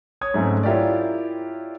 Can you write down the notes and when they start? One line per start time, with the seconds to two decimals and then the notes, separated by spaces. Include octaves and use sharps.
0.21 C#5 D#6 G#6
0.34 G#2 F#3 A3 C4 C#4 G#4
0.63 E4 F4 G4 A#4 C#5 D5